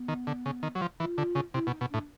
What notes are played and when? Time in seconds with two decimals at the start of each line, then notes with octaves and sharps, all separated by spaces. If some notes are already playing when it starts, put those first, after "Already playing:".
Already playing: B3
0.08 D#3
0.27 D3
0.46 C#3
0.63 D#3
0.75 F#3
0.81 F3
1.00 E3 F4
1.18 D3
1.35 C#3
1.54 C3 E4
1.67 B2
1.71 D#4
1.81 B2
1.90 A2 D4